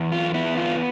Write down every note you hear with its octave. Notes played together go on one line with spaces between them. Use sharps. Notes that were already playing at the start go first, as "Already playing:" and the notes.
Already playing: E2
F4
B3 E4
F4